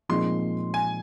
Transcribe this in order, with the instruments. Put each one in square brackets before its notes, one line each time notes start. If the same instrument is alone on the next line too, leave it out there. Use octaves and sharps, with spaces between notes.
[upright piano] A#2 F3 G#3 C4 D#4 [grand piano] C6
[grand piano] G#5